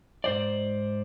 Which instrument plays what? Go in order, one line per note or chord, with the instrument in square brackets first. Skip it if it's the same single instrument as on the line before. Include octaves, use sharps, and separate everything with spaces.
[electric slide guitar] G#2 C5 D5